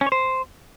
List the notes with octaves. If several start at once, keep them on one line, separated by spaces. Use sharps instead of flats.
C#4
C#5
C5